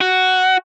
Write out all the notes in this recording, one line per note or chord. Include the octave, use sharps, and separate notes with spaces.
F#4